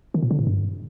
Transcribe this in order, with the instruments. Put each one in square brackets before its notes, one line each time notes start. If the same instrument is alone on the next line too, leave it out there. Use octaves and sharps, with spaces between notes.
[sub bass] D#3
A#2
D3
A2
G2